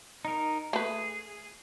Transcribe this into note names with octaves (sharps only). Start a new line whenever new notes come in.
D#4 A#4
A3 G#4 B4